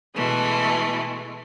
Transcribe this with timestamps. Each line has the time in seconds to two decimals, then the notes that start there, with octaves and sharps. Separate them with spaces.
0.14 B2 E3 G#3 A3